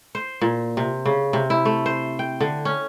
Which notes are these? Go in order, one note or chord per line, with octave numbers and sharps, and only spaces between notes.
C5
A#2
C3
C#3
C3
E4
A3
C5
G5
D3
C#4